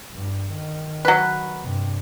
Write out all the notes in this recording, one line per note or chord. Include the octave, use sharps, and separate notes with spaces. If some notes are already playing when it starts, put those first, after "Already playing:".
G2
D#3
F#3 B4
G2 C3